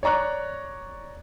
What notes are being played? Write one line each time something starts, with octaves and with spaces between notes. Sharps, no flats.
C#5 D5 A#5 C#6 F#6